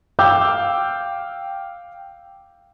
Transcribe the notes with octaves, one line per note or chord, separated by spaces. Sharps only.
F5 G5 D6 E6 G6